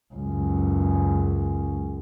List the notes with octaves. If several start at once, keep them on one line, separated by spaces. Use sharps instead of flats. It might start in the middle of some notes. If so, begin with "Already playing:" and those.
C#2 F#2